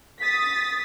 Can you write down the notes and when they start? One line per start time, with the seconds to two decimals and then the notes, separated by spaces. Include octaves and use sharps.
0.19 D#6 A6 B6